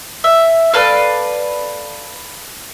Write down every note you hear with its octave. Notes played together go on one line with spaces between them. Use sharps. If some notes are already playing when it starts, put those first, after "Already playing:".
E5
A4 B4 D5 F5